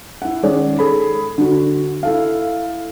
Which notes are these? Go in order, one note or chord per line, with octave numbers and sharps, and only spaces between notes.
E4 F#5
D#3 G#3 C#4 G#4 C#5 D5
G#4 A4 B5
D3 F#4
E4 A4 F5